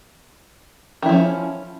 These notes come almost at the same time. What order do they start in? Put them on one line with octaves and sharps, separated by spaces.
D#3 E4 F3 C#4